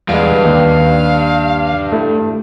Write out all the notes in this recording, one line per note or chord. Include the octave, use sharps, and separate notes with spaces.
E2 G2 G#3 F5
D#2
A3 E4